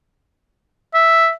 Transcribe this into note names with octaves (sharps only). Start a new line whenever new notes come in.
E5